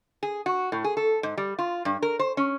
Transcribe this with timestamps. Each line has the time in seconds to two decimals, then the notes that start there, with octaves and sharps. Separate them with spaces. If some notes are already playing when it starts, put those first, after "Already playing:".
0.23 G#4
0.46 F#4
0.72 A2
0.84 G#4
0.97 A4
1.23 G#2
1.37 G3
1.59 F4
1.85 G2
2.02 A#4
2.19 C5
2.37 C#4